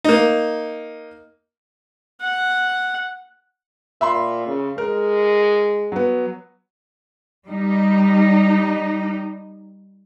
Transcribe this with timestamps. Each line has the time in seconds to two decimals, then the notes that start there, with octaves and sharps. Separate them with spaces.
0.04 A#3 D#4
2.21 F#5
4.01 A#2 E5 B5 C6
4.47 C#3
4.78 G#3 A#4
5.92 F#3 B3
7.47 G3 D#4